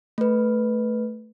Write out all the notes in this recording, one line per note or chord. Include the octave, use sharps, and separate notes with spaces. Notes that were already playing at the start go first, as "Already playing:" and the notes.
A3 B4